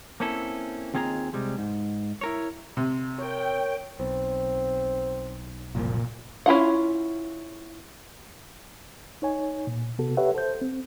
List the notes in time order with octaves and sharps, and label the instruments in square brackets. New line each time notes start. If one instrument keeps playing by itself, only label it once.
[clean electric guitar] A#3 C4 C#4 E4 A4
D#2 C4 F4 G#4 D#5 A#5
C3 G3 G#3
G#2
E4 A#4 C#5
[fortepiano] C3
[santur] A#4 C#5 [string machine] G5
[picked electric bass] B1 [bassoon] C4
[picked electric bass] F#1 C2 F3 [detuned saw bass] A#2
[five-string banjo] C#4 E4 F4 F#5
[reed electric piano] D#4 C#5 G#5
A#2
C3 B3 F#4 A4
G4 A4 B4 C#5 E5 F#5
A4 C5 G6
C4